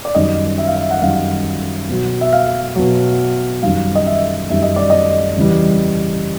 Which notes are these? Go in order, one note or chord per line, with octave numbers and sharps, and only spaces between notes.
D5
F#2 D#3 G3 D#5
E5
F5
E5
F#5
F#2 D#3 G3 F5
B2 F#3
E5
F5
B2 F#3
F#2 D#3 G3 F5
D#5
E5
F#2 D#3 G3 E5
D#5
D5
D#5
E2 C#3 E3 G3